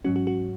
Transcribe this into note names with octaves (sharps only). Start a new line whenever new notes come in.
G#2 F#3 C#4 F#4
F#4
F#4